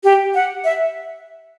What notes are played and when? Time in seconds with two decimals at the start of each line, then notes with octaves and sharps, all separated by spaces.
0.04 G4
0.34 F#5
0.64 E5